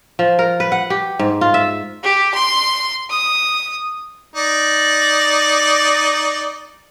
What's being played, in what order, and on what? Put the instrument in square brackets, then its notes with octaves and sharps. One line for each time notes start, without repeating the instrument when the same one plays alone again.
[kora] F3
A#4
B4
F#5
G4
G#2
F4
E5
[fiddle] G4
C6
D#6
[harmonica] D#4 D5